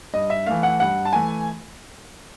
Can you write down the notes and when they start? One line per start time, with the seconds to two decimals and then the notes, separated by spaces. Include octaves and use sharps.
0.14 G2 D#5
0.30 E5
0.46 E3 A3 F5
0.63 F#5
0.80 G2 F#5
1.05 A5
1.13 E3 A3 G#5